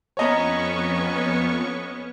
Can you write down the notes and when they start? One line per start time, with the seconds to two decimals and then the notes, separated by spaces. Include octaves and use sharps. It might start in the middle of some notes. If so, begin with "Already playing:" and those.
0.17 F2 B3 C#4 C#5 D#5 A#5 C#6